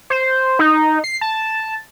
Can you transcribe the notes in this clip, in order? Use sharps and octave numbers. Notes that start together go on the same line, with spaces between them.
C5
D#4
C7
A5